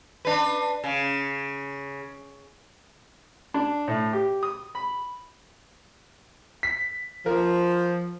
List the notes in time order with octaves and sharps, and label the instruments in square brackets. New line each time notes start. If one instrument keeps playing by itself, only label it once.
[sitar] D4 B4
C#3
[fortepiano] D4
A2
G4
D#6
B5
[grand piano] B6
[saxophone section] F3 [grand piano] A#4